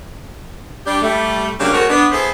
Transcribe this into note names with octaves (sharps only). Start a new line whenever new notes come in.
G3 D4 G4
G3 A3
C#3 F#3 G3 A#3 D4
A3 C4 F#4 G#4 A#4 C#5
B3 D4
B3 E4 G#4 A4 C5